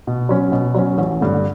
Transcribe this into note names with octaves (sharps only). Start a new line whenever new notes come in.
B2
F#3 C#4
B2
F#3 C#4
A1
G2 D3